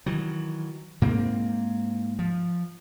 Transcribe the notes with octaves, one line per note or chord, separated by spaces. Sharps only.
D#3 E3 F#3
G#2 A#3 C4
F3